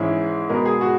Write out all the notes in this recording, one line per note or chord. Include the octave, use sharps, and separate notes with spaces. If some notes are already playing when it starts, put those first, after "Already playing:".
Already playing: G#2 E3 G#3 C#4 E4
B2 G#3 B3 A#4
G#4
F#4